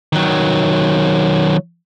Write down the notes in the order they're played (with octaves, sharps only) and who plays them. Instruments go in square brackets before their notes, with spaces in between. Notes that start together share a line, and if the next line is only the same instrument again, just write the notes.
[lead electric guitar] D#3 F#3